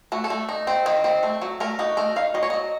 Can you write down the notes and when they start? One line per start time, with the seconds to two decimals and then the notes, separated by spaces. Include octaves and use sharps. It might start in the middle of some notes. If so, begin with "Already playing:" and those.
0.12 A3 F#4
0.24 A4
0.30 A3
0.49 D#4
0.67 C4
0.86 D#3 C5
1.04 C4
1.23 A3
1.42 F#3
1.60 A3 A#4
1.79 D#4 F#4
1.97 A3 A#4
2.16 D#4 F5
2.34 F#3 D#5
2.43 C#5
2.50 F#3 D#5